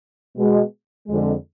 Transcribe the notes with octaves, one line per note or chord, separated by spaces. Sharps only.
B2 G#3
F2 D3 G#3